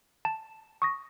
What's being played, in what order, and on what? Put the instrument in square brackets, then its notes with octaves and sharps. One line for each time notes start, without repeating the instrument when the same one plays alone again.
[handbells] A5
C#6 D#6 A#6